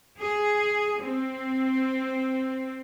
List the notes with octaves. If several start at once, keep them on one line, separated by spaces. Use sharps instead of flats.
G#4
C4